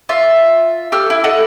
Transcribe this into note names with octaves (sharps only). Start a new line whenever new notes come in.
F4 E5
G4 A4 E6 F6
E4
A4 D#5 F#5